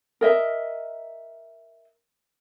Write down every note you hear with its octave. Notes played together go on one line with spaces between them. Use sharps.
A#4 D#5 E5